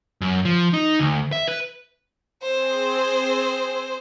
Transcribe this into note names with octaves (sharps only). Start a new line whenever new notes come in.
F#2
F3
D#4
D2
E5
B4
C4 G#4 C5